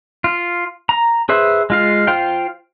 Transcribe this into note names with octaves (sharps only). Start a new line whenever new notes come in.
F4
A#5
G#4 B4 C5 E5
G#3 F4 F5
F4 C5 F5 G5